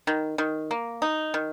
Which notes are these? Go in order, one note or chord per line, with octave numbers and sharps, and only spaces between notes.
D#3
D#3
A#3
D#4
D#3